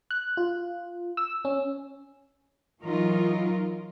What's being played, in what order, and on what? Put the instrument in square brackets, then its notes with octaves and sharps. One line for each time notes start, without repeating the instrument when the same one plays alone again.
[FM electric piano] F#6
F4
E6
C#4
[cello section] E3 F#3 D#4 F4 A#4